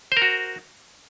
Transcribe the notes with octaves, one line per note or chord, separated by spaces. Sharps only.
F#4 A#4 C5